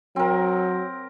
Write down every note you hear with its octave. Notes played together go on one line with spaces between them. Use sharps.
F#3 C4 A#4